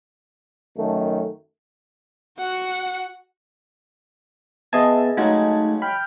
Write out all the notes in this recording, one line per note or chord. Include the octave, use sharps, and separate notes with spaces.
F#2 D#3 A3
F#4 F#5
B3 G#4 D#5 E5 G#5 A5 C6
C#3 F#3 G#3 A3 D#4
G5 B5 F6